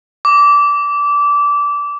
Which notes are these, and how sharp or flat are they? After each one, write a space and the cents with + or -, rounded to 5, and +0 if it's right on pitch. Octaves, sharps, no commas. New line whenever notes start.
D6 -20